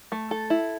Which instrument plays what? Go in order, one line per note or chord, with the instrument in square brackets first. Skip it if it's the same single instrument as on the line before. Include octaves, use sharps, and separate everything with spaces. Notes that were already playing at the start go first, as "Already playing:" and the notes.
[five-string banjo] A3
A4
E4